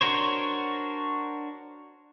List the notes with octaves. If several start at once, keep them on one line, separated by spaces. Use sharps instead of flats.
D4 F#4 A#4 C5 C#5